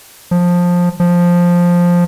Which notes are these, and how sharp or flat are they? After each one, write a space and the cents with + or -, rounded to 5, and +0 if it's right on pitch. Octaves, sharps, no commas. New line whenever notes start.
F3 +15
F3 +5